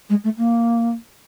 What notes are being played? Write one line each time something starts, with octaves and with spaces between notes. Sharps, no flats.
G#3
A3
A#3